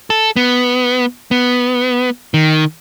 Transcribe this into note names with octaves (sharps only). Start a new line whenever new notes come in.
A4
B3
B3
D#3